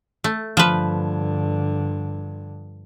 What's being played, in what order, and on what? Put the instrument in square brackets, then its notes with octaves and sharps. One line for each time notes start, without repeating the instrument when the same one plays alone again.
[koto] A3
[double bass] G2 D3 [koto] F3 B4